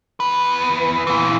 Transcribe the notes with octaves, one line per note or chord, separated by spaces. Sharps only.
E2 B4
A#2 E3